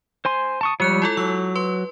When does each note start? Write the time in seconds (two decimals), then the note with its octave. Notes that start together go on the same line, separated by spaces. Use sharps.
0.25 C5 G#5 C6
0.61 A5 C#6 D#6
0.80 F3 G3 G#3 C#5 F#6 G6
1.02 E4 F4 A4
1.17 F#3 E6
1.56 B4 C6